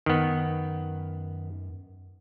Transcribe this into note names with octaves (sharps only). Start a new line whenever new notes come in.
F#2 D#3 B3